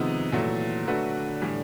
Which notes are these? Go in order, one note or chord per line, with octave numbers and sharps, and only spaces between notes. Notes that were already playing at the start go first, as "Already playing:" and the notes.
Already playing: C3 D#3 F3 G#3 B3 D#4
A#2 E3 F#3 A3
D3 F#3 A3 D4 F#4 B4
A2 E3 G3